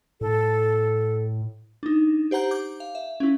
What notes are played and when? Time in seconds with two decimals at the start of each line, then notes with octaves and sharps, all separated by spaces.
0.21 A2 A4
1.83 D4 D#4
2.31 G4 C5 F#5 A#5 G6
2.51 D6 G6
2.80 F5
2.95 E5
3.20 C#4 E4